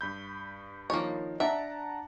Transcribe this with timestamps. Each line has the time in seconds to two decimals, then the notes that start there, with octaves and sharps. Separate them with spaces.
0.01 G2 B5 G6
0.90 D#3 F3 A#3 D#4 C#5
1.40 D4 E5 F#5 A5 A#5 D7